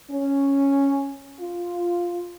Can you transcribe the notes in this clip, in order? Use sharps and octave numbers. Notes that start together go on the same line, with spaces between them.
C#4
F4